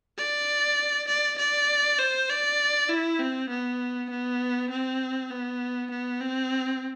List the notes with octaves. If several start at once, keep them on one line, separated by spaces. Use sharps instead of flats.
D5
D5
D5
C5
D5
E4
C4
B3
B3
C4
B3
B3
C4